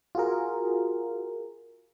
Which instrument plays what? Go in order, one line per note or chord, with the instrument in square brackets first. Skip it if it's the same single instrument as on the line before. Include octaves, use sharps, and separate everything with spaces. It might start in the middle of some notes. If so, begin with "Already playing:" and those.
[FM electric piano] F4 F#4 G#4 A#4